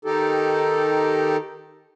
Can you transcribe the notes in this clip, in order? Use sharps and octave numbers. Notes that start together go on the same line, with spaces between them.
D#3 D#4 G4 A4